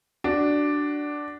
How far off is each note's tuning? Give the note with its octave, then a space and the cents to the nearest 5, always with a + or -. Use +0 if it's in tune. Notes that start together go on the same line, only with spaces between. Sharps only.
D4 +0 F#4 +15